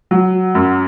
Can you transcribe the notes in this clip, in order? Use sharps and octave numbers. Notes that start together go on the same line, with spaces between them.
F#3
F#2